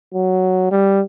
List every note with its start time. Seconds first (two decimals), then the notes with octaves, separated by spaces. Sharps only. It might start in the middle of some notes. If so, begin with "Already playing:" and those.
0.14 F#3
0.71 G3